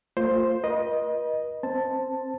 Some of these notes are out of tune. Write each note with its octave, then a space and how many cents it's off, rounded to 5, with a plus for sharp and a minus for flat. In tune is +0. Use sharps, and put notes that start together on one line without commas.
A3 +45 F4 +0 C5 +5
B4 -45 D#5 +0
C4 +15 C5 +0 A5 +5